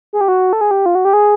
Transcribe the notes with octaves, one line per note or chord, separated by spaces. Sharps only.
G#4
G4
F#4
A4
G#4
G4
F4
F#4
G4
G#4